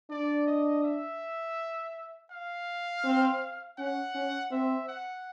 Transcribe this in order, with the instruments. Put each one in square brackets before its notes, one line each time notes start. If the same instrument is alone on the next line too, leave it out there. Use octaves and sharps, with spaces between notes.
[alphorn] D4 [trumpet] D5
[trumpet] D#5
E5
F5
[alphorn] C4
[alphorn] C#4 [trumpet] F#5
[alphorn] C#4
[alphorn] C4 [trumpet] E5
[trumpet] F#5